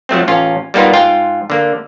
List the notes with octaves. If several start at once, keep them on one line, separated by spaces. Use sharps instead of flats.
F3 F#3 A3 C4
A1 C#4 F4
G3 A#3 B3 D#4 F4
G#2 F4 G5
D3 A#3